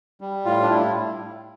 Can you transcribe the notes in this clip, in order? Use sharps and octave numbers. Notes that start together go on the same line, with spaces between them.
G3
A2 F4
D4
A2 E4